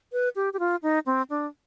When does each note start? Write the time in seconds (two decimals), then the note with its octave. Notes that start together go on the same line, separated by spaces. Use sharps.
0.12 B4
0.36 G4
0.53 G4
0.59 F4
0.83 D#4
1.06 C4
1.30 D4